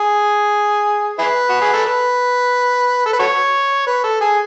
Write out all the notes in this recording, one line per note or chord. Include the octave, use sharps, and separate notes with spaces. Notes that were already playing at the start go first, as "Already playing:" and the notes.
Already playing: G#4
E4 G#4 B4
F#4
G#4
A4
B4
A4
B4
F#4 A4 C#5
B4
A4
G#4